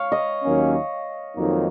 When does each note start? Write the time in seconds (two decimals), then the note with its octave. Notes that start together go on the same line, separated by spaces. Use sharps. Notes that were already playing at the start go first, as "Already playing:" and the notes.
Already playing: C#5 F5
0.12 D#5
0.43 D#2 D#3 F#3 A#3 C#4
1.35 F2 D#3 F#3 A#3 D#4